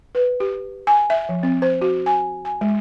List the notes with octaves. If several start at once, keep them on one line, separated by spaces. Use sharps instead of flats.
B4
G4
G#5
E5
F3
C4
C5
F#4
G#5
G#5
G#3